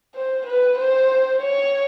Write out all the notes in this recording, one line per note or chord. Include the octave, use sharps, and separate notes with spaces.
C5
B4
C5
C#5